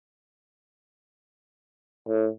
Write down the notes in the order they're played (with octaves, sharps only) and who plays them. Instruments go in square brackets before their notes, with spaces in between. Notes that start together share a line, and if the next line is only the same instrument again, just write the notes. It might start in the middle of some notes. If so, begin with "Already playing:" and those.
[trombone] A2